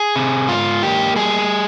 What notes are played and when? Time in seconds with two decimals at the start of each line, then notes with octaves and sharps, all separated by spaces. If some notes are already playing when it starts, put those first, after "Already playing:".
Already playing: G#4
0.16 C3
0.48 G#2 F4
0.83 A#3 G4
1.16 G3 G#4